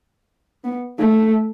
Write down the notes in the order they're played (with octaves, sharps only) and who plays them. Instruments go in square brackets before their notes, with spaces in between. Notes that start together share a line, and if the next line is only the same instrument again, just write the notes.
[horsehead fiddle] B3
A3